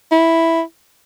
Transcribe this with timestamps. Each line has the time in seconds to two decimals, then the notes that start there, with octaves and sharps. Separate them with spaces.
0.11 E4